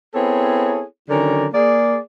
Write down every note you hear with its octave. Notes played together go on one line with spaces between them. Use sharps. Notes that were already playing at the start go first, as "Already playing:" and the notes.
B3 C4 E4 G#4 A4 C#5
D3 D#3 F#3 C#4 A#4 D5
A#3 G#4 D5